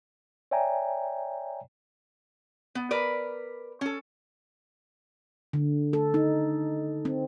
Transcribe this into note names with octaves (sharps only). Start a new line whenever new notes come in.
C#5 D5 E5 G5 G#5 A#5
B3
A#4 B4 D5
C#4 A4
D3
A4
D#4
C4